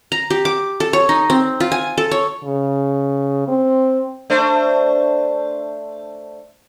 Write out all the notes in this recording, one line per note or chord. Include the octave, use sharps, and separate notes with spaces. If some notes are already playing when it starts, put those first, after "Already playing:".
A#5
G4
D6
A4
C#5
D#4
C4
F4
G#5
A4
C#5
C#3
C4
A3 D4 C5